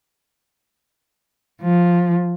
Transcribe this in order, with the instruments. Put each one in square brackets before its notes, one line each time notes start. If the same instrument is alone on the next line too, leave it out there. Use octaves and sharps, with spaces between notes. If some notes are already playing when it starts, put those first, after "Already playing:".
[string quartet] F3